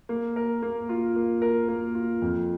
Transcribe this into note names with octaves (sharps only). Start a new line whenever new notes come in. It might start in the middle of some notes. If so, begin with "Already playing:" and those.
A#3
A#4
A#3
F4
A#3
A#4
A#3
F4
F2